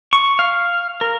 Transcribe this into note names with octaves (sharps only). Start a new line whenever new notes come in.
C#6
F5
A#4